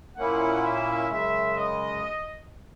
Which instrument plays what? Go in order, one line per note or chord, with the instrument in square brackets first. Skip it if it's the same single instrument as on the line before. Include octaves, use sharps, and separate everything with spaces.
[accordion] A#2 A#3 C#4 E4 [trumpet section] F#5
[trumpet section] E5
[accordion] F#2 C#3 G#3 [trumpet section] E5
[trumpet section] D#5